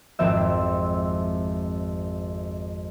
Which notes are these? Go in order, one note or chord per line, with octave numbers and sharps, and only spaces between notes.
G#1 F2 C4 E5